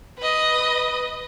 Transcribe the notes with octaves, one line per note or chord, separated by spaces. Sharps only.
B4 D#5